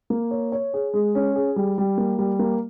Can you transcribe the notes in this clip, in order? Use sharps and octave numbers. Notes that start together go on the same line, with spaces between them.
A#3
C#5
C#5
G#4
G#3
C#4
G#4
G3
G3
A#3
G3
A#3